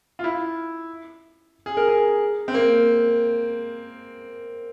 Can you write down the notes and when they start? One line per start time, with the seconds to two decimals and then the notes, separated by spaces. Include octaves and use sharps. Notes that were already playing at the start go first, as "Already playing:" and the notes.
0.19 F4
0.24 E4
1.66 G#4
1.77 A#4
1.89 G#4
2.48 C4
2.54 A#3